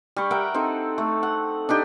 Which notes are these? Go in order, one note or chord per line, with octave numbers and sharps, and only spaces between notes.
G3 C#6
A#4 E5 F#5 G5
C4 D#4 A4
A3
F#5
D4 D#4 G4 D#5